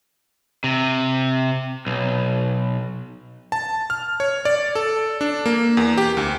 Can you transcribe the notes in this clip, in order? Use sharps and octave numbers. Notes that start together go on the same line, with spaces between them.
C3
B1
A5
F6
C#5
D5
A4
D4
A#3
E2
G4
D2